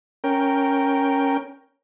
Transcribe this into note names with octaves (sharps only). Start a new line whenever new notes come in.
C#4 A#4 G5